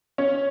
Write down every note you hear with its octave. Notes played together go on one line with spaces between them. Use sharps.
C#4